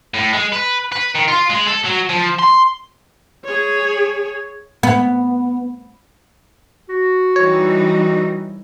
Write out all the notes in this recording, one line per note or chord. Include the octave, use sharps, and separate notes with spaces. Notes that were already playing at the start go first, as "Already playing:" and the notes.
A2
G#3
B4
B4
D#3
F4
G#3
A4
F#3
F3
C6
G#4 C#5
B3
F#4
E3 G3 D#4 C#5